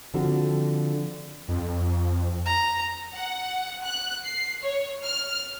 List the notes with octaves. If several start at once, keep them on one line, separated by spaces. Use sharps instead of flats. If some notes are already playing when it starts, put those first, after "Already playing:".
D3 F3 C4 F#4 A4
F2
A#5
F#5
F#6
C7
C#5
F6